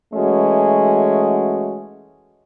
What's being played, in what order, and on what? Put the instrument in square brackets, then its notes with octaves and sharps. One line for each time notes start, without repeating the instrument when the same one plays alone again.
[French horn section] E3 G#3 A3 C#4 F#4